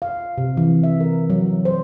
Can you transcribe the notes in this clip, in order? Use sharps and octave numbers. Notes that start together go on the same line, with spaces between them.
F5
C3
E3
E5
A#4
F#3
C5